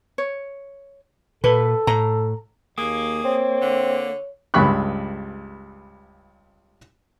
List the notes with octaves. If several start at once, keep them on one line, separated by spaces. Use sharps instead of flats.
C#5
A#2 A4 B4
A2 A#5
D#2 A#3 G#4
C4 C#5
D3
C#2 G2 G3 B5 C#6 F#6